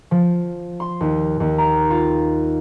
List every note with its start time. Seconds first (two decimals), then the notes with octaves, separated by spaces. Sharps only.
0.11 F3
0.80 C6
1.01 D#2
1.40 D#2
1.58 A#5
1.90 F4